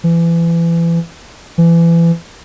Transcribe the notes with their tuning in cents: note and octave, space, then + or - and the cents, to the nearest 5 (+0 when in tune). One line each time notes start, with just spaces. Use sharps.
E3 +30
E3 +30